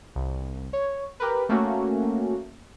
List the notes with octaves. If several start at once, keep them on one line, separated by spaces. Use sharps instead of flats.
C2
C#5
G4 A#4 B4
A3 A#3 C#4 F#4